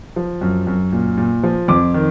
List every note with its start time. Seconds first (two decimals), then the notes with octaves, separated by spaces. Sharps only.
0.16 F3
0.41 F#2
0.67 F#2
0.92 A#2
1.17 A#2
1.43 F3
1.68 F2 D6
1.94 D#3